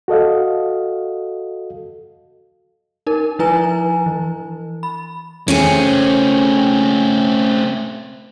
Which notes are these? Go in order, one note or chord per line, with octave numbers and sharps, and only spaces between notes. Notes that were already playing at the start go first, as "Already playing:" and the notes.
F#4 A4 D#5 F5
D#4 A#4
F3 E4 B4 G#5 A#5
E3
B5
A3 C4 C#4 G#4